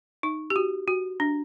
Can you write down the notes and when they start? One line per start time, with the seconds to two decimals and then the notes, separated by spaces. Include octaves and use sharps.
0.23 D#4
0.50 G4
0.56 F#4
0.88 F#4
1.20 D4